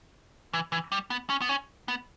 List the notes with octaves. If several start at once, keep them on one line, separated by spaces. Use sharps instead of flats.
E3
E3
G3
B3
C#4
B3
C#4
B3